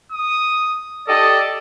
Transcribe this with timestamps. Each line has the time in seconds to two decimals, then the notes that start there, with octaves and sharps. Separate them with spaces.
0.12 D#6
1.08 G4 A4 D5 D#5